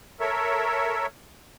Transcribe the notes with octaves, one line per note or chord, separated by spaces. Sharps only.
A4 A#4 C#5 E5